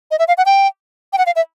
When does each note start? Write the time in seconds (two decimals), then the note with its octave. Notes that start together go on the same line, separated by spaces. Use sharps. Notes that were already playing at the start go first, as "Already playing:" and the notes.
0.11 D#5
0.19 E5
0.28 F5
0.38 F#5
0.46 G5
1.13 G5
1.18 F#5
1.26 F5
1.36 E5